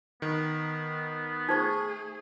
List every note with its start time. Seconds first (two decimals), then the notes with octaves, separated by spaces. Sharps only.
0.22 D#3 B3
1.49 A3 D#4 G#4 C5 C#6